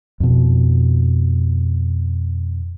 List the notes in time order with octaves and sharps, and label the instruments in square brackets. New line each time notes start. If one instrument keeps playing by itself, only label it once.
[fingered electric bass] F2 B2